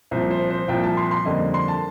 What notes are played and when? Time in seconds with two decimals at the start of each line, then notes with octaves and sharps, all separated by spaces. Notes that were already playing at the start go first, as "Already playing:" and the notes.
0.11 C2 A#2 F3 C5
0.31 C5
0.50 C5
0.68 C2 A#2 F3 G5
0.84 A5
0.97 C6
1.11 C6
1.25 F2 D3 G3 A#3 D#5
1.54 C6
1.68 A5